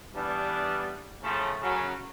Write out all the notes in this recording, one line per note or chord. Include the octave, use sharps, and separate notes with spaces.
E3 G3 B3 D4
A2 C#3 F3 A3
F#2 C#3 F#3